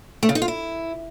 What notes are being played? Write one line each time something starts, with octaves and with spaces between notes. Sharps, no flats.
A3
C#3
D#4
F4
E4